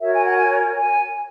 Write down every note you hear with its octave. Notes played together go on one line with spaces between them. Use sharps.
F#4 A#4 C#5 E5
G#5
F#5
G#5
G#5